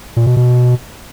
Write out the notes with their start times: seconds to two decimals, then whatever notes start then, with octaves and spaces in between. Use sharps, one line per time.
0.17 A#2
0.27 B2
0.37 B2